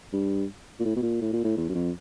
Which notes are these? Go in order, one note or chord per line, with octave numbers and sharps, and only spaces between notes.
G2
A#2
A2
B2
A#2
A2
A#2
A2
E2
F#2
F2